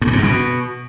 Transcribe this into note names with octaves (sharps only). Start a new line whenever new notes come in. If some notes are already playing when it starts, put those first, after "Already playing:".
G2
A#2
G#2
F#2
B2